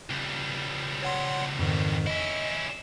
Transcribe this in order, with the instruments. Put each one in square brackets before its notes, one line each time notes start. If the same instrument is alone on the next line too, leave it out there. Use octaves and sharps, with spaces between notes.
[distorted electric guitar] C#2 G3
[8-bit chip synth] C#5 F#5 C6
F2 G#2 D#3
[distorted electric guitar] C#4 E4 [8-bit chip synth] D#5